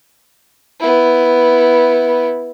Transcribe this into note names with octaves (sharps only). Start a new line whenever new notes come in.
B3 E4